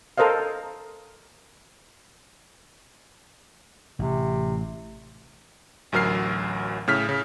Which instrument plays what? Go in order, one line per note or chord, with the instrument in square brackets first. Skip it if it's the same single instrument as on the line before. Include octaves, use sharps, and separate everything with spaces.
[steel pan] A4 A#4 C5 D#5 F5
[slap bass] A1 [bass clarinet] C3
[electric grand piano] A1 D2 F#3 A#4 F6 C7
A2 C#3 F6 B6
C#3